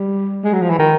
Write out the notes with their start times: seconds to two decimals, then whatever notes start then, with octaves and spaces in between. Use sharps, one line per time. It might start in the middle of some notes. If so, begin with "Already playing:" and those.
Already playing: G3
0.44 G#3
0.53 F#3
0.61 F3
0.70 E3
0.79 D#3